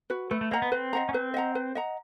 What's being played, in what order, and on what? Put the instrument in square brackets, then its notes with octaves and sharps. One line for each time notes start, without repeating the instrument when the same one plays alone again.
[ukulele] F#4 B4
[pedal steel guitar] A3 [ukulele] B4
[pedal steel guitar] A3
[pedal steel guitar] A#3 [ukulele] D#5 F#5 A#5
[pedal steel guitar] B3
[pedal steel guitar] C4 [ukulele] B4
[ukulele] D#5 F#5 A#5
[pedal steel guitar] C#4
[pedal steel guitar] C4 [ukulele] B4
[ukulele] D#5 F#5 A#5
B4
D#5 F#5 A#5